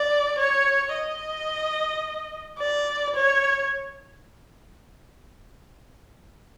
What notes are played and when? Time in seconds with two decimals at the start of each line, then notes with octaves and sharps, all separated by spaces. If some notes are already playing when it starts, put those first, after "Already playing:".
Already playing: D5
0.39 C#5
0.94 D#5
2.59 D5
3.15 C#5